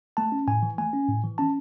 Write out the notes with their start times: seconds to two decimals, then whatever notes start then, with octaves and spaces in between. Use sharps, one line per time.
0.17 A3 A5
0.32 C#4
0.48 A2 G#5
0.62 E3
0.78 A3 G#5
0.93 C#4
1.09 A2
1.24 E3
1.38 C#4 A5